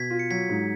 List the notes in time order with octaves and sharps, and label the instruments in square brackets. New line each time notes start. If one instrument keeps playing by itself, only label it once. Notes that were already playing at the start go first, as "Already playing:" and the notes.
Already playing: [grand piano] B2 [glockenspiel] G#6 B6
[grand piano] F4
[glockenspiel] C#7
[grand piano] F#3 [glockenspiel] G#6 B6
[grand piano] G#2